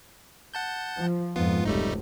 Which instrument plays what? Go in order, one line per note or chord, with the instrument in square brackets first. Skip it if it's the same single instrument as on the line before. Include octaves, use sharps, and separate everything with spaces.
[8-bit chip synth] F#5 A5 G6
[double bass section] F3
[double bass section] F2 G#2 F3 [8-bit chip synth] B3 F4
[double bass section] F1 C#2 C3 [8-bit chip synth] G3 A3 D#4